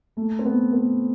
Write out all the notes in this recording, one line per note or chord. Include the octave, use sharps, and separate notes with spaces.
A3
C4
B3
B3